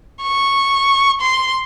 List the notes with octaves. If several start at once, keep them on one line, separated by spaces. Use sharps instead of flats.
C#6
C6